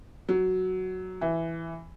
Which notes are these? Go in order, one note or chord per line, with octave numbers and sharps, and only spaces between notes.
F#3
E3